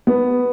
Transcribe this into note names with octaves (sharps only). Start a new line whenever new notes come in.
B3